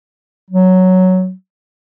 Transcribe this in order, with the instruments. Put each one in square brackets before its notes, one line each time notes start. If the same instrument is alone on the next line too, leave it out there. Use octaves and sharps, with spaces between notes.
[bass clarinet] F#3